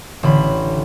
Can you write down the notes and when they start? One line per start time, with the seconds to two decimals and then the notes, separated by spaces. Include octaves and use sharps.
0.23 A1 D3 B5